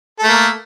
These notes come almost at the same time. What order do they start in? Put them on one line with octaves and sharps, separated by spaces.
A4 A3 A#3